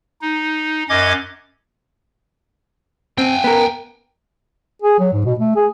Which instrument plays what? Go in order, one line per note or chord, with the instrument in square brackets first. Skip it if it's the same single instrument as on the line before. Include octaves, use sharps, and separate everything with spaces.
[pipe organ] D#4
F#2 C#4 D#5 D6 G#6
[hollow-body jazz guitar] C4 [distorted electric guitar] G5 G#5
[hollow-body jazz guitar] B3 A#4
[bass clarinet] G#4
F#3
G#2
B2
A3
G#4